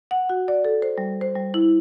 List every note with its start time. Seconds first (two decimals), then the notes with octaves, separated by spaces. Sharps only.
0.11 F#5
0.29 F#4
0.48 D5
0.65 A4
0.82 C5
0.98 G3
1.21 C5
1.35 G3
1.54 E4